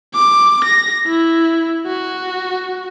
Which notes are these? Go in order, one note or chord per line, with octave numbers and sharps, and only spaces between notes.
D6
A#6
E4
F#4